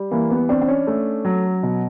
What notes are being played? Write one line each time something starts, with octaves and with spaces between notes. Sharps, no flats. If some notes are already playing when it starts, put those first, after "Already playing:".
Already playing: G3
E3 A#3
B3
C4 D4
C4
C#4
A3
F#3
B2